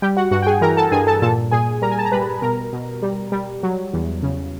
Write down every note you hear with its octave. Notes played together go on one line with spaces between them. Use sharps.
G3 G4 G5
F#4 F#5
G2 F#4 F#5
G5
G#4 G#5
E3 A#4 A#5
A4 A5
G2 G#4 G#5
A4 A5
A#2 A4 A5
A#2 G#4 G#5
G3 A#4 A#5
G#5
A5
A#5
G3 B4 B5
B2 A#4 A#5
B2
G3
G3
F#3
E2
C#3